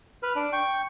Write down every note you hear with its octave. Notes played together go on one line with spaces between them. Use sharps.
B4 F6
D4
G5 C#6